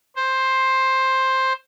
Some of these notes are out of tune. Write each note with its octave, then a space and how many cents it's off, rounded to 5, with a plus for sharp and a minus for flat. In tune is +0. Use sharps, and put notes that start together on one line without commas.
C5 +10